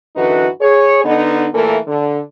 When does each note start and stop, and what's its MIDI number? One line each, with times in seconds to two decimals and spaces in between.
0.16 0.47 42
0.16 0.47 50
0.16 0.47 52
0.16 0.47 63
0.16 0.47 66
0.16 0.47 71
0.61 1.03 68
0.61 1.03 73
1.04 1.47 50
1.04 1.47 59
1.04 1.47 63
1.53 1.78 46
1.53 1.78 52
1.53 1.78 57
1.53 1.78 58
1.53 1.78 69
1.53 1.78 70
1.87 2.20 50